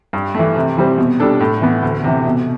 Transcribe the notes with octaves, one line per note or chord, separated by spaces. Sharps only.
G2
E3 A3
C3
E3 G3 C4
B2
G3 D4 A4
A2
E3 B3
D2
C3 E3
B2